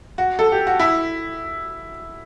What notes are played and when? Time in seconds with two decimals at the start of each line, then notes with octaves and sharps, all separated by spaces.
0.18 F#4
0.39 A4
0.52 G4
0.67 F#4
0.80 E4